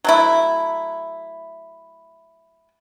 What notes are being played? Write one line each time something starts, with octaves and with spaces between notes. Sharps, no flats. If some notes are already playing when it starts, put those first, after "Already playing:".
F#3 A3 E4